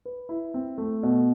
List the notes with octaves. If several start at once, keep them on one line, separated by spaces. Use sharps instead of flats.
B4
E4
C4
A3
B2